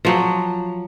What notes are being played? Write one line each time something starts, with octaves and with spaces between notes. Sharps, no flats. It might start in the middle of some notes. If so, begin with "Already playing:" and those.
F3 F#3